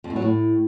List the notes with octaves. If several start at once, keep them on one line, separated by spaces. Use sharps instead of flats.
F2
A2
F#3
A2